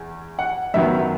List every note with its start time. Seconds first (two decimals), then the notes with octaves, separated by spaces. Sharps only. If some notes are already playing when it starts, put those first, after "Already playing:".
Already playing: E2
0.39 F#5
0.74 F#2 D#3 F#3 B3 E5